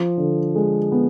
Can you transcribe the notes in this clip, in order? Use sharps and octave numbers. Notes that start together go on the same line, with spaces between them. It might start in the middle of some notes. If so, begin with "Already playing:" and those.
Already playing: F3
D3
G#3
B3